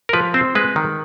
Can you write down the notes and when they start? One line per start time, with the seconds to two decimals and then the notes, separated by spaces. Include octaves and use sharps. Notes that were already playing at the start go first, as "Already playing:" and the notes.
0.09 A#4
0.13 F3 B4
0.34 C4 C5
0.55 G#3 B4
0.76 D#3